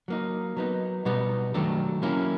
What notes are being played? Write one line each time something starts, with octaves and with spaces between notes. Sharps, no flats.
F#3 A#3 D#4
F#3 B3 D#4
B2 G3 B3 D#4
D#3 F#3 A3 D4
F#3 A#3 C#4 E4